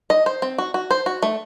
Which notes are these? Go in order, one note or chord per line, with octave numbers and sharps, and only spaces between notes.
D#5
C5
C4
F#4
F#4
C5
F#4
A3